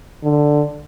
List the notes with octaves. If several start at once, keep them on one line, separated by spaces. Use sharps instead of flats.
D3